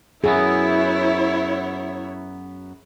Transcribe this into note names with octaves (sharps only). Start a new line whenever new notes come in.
F#2 F#3 B3 E4 G#4 C#5